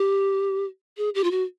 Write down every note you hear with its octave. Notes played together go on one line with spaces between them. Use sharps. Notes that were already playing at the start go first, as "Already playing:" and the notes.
Already playing: G4
G#4
G4
F4
F#4